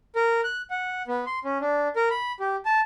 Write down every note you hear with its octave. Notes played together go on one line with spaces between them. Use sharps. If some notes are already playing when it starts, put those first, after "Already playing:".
A#4
F#6
F#5
B3
C6
C#4
D4
A#4
B5
G4
A5